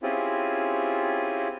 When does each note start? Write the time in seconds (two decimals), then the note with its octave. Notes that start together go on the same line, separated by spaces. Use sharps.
0.03 C4 C#4 E4 F4 G4 G#4